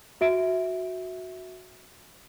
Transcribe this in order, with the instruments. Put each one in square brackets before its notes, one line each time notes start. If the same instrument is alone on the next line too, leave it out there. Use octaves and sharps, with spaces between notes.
[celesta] F#4 E5 D7